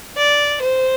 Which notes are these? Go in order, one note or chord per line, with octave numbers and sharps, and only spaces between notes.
D5
C5